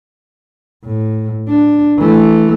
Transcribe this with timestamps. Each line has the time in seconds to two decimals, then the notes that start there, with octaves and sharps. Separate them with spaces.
0.84 A2
1.49 D4
1.99 E3 A3